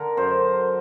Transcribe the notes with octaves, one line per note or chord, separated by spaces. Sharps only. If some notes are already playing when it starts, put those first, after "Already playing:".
Already playing: D3 A#4
F#2 C5